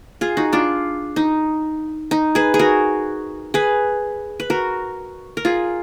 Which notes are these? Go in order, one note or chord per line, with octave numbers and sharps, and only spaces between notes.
F4 G#4
D#4 F#4
D4 F4
D#4
D#4
G#4 B4
G#4
F#4 A#4
G#4 B4
B4
F#4 A#4
A#4
F4 G#4